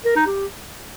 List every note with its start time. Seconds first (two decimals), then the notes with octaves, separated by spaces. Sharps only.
0.05 A#4
0.16 D#4
0.27 G4